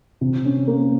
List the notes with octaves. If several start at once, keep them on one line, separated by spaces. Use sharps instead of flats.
C3
C#4
A#3